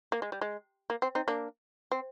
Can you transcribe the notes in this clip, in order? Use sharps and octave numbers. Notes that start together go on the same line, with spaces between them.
A#3
G#3
G3
G#3
A#3
C4
C4 D#4
A#3 D4
C4